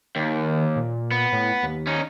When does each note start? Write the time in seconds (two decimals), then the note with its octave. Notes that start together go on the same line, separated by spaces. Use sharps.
0.16 D#2 D#3
0.76 A#2
1.11 B3
1.32 A2
1.63 D#2
1.87 C#4 D#4